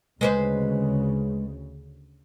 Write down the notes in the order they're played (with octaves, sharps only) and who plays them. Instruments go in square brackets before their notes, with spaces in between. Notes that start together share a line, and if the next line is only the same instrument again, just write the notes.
[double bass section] D2 C#3 [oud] G#3 B4 C5